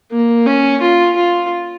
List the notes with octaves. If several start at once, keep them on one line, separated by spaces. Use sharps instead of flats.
A#3
C#4
F4
F4